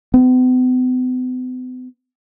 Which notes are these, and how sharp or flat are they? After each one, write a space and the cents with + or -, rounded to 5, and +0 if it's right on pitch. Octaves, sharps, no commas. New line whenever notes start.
B3 +45